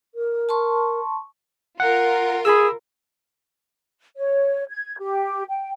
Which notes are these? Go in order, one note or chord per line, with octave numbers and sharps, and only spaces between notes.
A#4
A5 C6 C#6
F4 A#4 F#5
G#4 B5 E6
C#5
G#6
G4
G5